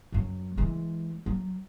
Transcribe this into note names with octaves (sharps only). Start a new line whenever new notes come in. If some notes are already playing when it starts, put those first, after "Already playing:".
F#2 F#3
E3 G#3
F#3